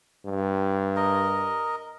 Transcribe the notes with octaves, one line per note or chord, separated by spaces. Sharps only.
G2
A#4 D#5